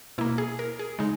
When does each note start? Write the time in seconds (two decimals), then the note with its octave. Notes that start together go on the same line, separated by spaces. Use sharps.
0.18 B2 A#3 E4
0.38 G#4
0.59 A#4
0.79 G#4
0.99 C#3 G#3 D#4